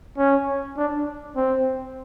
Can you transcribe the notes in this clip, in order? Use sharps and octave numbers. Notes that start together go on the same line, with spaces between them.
C#4
D4
C4